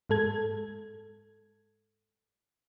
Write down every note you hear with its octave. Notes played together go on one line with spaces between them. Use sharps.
G#2 G#3 A4 G#6